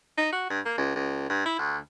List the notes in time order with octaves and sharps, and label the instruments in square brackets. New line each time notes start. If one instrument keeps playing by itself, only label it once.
[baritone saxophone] D#4
F#4
G2
A#3
C#2
C#2
G2
E4
D2